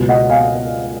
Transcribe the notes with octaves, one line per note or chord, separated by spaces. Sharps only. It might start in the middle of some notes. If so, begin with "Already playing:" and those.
Already playing: C#2 B2 F#3
D#5 F#5
F5 G#5